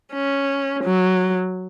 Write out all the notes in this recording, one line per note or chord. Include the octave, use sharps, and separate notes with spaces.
C#4
F#3